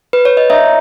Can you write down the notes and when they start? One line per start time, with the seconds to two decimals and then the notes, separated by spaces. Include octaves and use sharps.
0.13 B4
0.25 C#5
0.37 D#5
0.50 D#4 C#5 E5